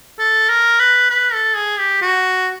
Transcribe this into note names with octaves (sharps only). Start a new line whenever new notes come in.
A4
A#4
B4
B4
A4
G#4
G4
F#4